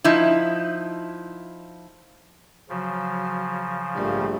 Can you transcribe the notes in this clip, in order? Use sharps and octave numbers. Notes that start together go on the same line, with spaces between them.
F3 D#4 E4
C#3 F3 F#3
A#1 G#2 G3 A3